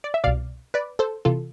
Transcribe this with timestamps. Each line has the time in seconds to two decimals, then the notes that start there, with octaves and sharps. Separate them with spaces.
0.04 D5
0.14 E5
0.24 C2 B2 D5 F5
0.74 B4 D5
0.99 A4 C5
1.25 C3 E3 F4 A4